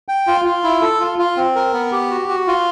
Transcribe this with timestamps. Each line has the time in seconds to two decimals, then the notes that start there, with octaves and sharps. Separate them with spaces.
0.08 G5
0.27 F4
0.45 F4
0.64 E4
0.82 A4
1.00 F4
1.19 F4
1.37 C4
1.55 A#4
1.73 B3
1.92 G4
2.10 F#4
2.29 F#4
2.47 F4